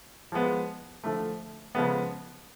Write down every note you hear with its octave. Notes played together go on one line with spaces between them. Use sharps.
F3 G#3 B3
D3 F3 A3
C#3 F3 G#3 B3